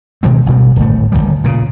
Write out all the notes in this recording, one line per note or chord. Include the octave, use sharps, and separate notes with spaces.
B2 D#3 G#3 C4
A1 B2 G3
D1 G#1 A3
G1 C#2 D#3 G3
A#2 C#3